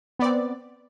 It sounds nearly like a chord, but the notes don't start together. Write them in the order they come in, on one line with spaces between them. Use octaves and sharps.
B3 D5 C4